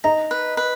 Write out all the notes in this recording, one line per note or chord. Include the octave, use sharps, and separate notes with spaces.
D#4 A#5
B4
B4